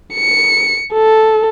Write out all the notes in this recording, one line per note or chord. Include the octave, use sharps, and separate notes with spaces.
C#7
A4